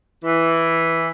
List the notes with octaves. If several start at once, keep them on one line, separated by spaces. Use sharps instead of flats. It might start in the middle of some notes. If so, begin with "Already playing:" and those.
E3